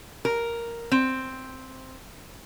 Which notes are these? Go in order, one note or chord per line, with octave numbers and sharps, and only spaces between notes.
A#4
C4